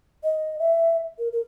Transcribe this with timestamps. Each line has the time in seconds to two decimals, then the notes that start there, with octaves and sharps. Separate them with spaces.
0.23 D#5
0.59 E5
1.19 A#4
1.33 A#4